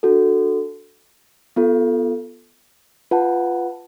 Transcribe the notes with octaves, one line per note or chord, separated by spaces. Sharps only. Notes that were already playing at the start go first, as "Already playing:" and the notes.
D4 F#4 A4
B3 F4 A4
F4 B4 F#5 A5